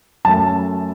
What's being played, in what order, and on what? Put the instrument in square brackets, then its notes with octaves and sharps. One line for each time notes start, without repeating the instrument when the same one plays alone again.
[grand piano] F#2 F#3 A3 A5